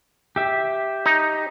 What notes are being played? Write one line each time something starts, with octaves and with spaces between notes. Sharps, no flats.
G4 E5
D#4